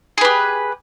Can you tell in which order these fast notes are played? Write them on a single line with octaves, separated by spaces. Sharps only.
G#4 B4 G4